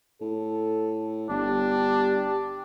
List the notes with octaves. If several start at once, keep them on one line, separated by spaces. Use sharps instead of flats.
A2 A4
G1 D4 G4